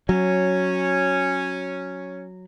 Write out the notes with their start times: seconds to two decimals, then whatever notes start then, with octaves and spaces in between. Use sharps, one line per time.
0.09 F#3 C#4